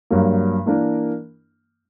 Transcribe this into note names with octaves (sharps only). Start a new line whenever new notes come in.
G2 F#3 A#3
E3 A#3 D4 A#4